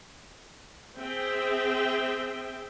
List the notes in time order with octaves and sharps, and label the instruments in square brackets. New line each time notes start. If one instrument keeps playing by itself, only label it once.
[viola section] C4 G#4 E5 G5